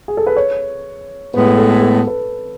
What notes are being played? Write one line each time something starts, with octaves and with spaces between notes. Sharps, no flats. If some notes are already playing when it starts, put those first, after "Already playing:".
G#4
A4
B4
C#5
A2 G#3 B3 B4
A4
A4
A4
A4
B4